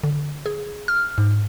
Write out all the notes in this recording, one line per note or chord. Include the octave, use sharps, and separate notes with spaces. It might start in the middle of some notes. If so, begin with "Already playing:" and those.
D3
G#4
F6
G#2